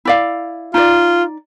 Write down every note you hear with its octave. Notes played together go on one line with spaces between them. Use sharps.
E4 D5 F5
D#4 F4 D5